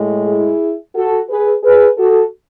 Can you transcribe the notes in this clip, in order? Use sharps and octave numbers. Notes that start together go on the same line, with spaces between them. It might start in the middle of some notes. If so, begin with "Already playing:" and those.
Already playing: A2 G#3
E4 G#4
F#4 A4
G#4 B4
G#4 B4
F#4 A4